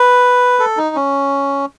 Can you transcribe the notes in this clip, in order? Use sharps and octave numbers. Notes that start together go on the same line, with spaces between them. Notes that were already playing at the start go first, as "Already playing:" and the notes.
Already playing: B4
A4
D#4
C#4